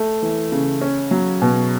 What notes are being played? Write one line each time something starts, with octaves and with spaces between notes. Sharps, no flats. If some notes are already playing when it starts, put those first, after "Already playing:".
Already playing: A3
E3
C#3
C#4
F#3
B2